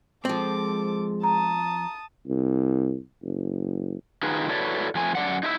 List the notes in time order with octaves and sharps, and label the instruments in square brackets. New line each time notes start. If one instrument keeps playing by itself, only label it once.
[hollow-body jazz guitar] F3 C4 [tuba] G#3 [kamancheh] A4 D6
[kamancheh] A5 D#6 [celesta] A#5
[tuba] C2
F#1
[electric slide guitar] D#3 D#4 F4 F#4 G#4 B4
E4 F#4 A4 B4 C#5 D5
F2 F3 A3 G#5
F#2 D5 F#5
D#4 E4 B4 E5